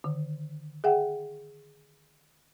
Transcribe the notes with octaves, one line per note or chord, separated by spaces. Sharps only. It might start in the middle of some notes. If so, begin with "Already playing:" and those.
D3 D#3
G#4 E5 F#5 G5